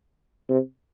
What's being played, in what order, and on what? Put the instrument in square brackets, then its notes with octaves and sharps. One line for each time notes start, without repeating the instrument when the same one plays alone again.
[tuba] C3